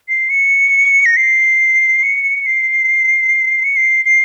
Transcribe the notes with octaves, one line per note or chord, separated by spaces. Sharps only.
C7
C#7
A#6
C7
C#7
C7
C#7
C7
C7